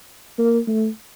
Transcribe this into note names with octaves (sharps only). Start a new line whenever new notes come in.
A#3
A3